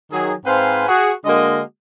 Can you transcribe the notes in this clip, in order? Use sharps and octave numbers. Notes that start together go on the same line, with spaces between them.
D#3 F#3 G#4
G#2 C4 B4 C5 F5 G#5
F#4 G#4
D3 G#3 A#3 F#4 D#5